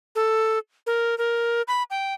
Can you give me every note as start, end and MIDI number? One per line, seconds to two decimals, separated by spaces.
0.15 0.59 69
0.87 1.17 70
1.18 1.62 70
1.68 1.83 83
1.91 2.14 79